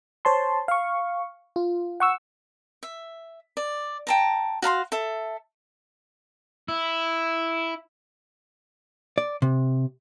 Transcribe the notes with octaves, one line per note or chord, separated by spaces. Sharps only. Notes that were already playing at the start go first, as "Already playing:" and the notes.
C5 C#5 A5 C6
F5 C#6
F4
F#5 C#6 E6
E5
D5
G5 A5 A#5
F#4 F5 A#5 C6
A4 E5
E4
D5
C3